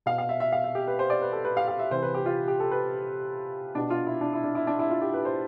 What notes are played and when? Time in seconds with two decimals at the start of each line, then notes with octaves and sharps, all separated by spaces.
0.06 B2 F5
0.18 F5
0.29 E5
0.40 E5
0.52 F5
0.64 E5
0.75 G4
0.88 B4
0.99 C5
1.10 D5
1.22 B4
1.33 A4
1.45 B4
1.57 F5
1.68 F5
1.79 E5
1.91 C3 E3 C5
2.03 B4
2.14 G4
2.26 F4
2.48 G4
2.60 A4
2.71 B4
3.75 B2 D4
3.90 F4
4.06 E4
4.21 D4
4.33 E4
4.44 D4
4.55 E4
4.67 D4
4.79 E4
4.90 F4
5.02 G4
5.14 B4
5.25 C5